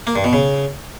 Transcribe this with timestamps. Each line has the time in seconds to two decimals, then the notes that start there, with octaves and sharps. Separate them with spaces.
0.07 A#3
0.16 G2
0.24 B2
0.33 C#3